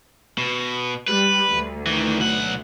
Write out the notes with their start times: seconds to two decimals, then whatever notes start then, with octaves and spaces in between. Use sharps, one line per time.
0.38 B2
1.08 G3 B4
1.51 D2
1.86 D#3 E3
2.19 B1 F#5